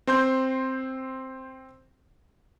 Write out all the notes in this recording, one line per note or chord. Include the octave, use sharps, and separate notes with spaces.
C4 C5 C6 G6